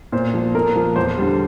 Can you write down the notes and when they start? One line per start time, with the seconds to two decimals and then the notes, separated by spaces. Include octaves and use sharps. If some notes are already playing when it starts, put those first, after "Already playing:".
0.12 A#2 C5
0.34 F3
0.55 A#2 A#4
0.76 F3
0.96 E2 C5
1.17 D3 G3